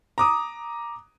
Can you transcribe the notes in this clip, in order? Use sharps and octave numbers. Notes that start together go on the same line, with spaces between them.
A#5 D6 D#6